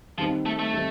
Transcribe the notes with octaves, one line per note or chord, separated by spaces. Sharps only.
D#3 F3 G3 C4 D#4
A3
A3
D#3 G3 C4 D#4